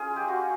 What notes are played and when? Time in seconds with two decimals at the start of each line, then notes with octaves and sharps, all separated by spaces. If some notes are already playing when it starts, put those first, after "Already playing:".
Already playing: C#4 F4 G#4
0.10 G#3
0.16 G4
0.28 F4 F#4